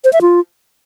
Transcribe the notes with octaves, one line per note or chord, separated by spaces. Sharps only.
C5
E5
F4